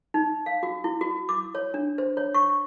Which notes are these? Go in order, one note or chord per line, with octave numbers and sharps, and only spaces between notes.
D#4
F5
F#4
E4
F#4
D6
C#5
D4
C5
C#5
C#6